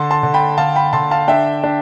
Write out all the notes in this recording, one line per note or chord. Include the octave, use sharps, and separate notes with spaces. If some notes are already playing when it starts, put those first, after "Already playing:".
Already playing: D3 A5 C6
A5 C6
D3
G5 B5
D3 F5 A5
G5 B5
D3 A5 C6
F5 A5
D4 E5 G5
D4